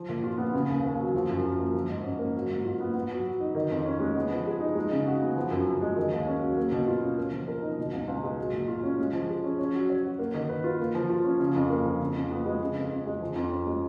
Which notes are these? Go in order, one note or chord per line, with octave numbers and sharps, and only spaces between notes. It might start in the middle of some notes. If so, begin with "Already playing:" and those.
Already playing: F3
A#2
F4
B3
C#3
D#2
D#2
F#3
F3
F#2
F4
A#3
F3
G#2
C#4
A#3
F#3
G#2
F4
B3
B3
F#3
F#3
D#4
D#3
F2
C#4
G#3
B3
F3
G#4
D#4
G#3
C#3
F#4
B3
F3
F#2
F#2
G#3
D#3
D#2
C#4
F#3
A#3
B2
F4
C#4
A#3
F3
A#4
D#4
B2
C#2
C#2
G#3
F#3
A#2
F4
C#4
G#3
F3
G#4
C#4
C#4
F#3
C#5
F#4
A#3
D#3
B4
F4
A#3
F3
F4
C#4
C#3
F2
A#3
F3
C#3
F2
B3
G#3
C#3
F2
F2
G#3
F3
F2
C#4
G#3